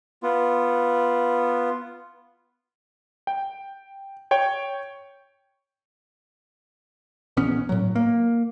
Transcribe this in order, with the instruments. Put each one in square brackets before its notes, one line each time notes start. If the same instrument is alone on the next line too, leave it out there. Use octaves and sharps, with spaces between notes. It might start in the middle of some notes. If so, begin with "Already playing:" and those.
[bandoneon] B3 F4
[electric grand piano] G5
C#5 G5 C#6
[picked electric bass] A#1 E2 B3 C#4
A2 F#3
A#3